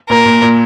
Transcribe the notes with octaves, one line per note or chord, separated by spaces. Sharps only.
A#2 A#4
A#2
A#2